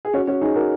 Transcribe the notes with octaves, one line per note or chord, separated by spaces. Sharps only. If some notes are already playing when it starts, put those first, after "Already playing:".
G#4
C#4 F#4
C#4 F#4
D#4 G#4
F#4 A#4